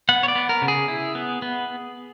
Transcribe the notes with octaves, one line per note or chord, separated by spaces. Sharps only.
B3 F#5
C#5
D5
B3
A#4
C#3
G#4
E4
B3
B3